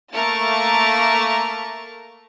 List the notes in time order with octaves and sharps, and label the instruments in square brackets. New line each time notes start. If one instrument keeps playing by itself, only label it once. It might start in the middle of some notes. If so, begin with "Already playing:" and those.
[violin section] A3 A#3 A#4 C#6 A6